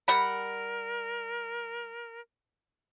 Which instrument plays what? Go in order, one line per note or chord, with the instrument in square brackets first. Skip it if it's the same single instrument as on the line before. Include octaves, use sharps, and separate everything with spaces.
[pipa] G3 F#5 B5 [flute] A#4